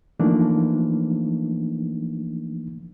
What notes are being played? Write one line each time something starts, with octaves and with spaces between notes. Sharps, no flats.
E3 F3 A3 A#3 D4 D#4